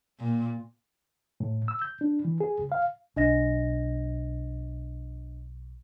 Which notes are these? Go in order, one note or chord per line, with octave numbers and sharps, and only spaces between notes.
A#2
A2
E6
G6
D4
E3
G#4
C#2
F5
B1 D4 D#5 A#6